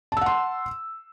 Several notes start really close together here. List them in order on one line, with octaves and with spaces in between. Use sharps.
A5 E6 F#5 C6